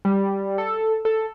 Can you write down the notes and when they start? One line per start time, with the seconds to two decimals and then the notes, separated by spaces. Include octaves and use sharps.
0.05 G3
0.58 A4
1.05 A4